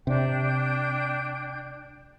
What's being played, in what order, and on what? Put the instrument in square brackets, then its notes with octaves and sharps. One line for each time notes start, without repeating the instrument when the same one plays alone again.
[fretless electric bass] C3 [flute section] D4 G5 G6